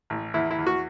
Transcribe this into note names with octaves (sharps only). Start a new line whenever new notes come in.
A1
E2 E4
E4
E2
F#4